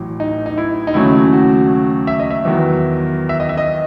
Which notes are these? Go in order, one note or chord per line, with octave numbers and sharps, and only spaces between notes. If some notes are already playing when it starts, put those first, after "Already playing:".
Already playing: A1 A2 F#3
D#4
D#4
E4
D#4
D#2 C#3 F#3 A3 C#4 E4
F#4
E5
D#5
E5
E2 D#3 F#3 B3
E5
D#5
E5
D#5